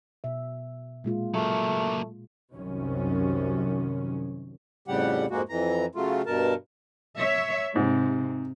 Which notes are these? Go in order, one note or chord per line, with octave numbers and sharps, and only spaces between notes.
B2 E5
A#2 G#3 F4
F#3 A3 A#3
C2 F#2 C3 D#3 C#4
F2 A2 C#3 G3 G4 F#5
F2 G#2 G#3 A#3 F#4
F2 E3 A#5
C#3 F#3 A3 F4
G2 B2 A#4 A5
C#5 E5
G#2 C3